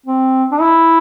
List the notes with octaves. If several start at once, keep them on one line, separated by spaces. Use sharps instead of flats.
C4
D4
E4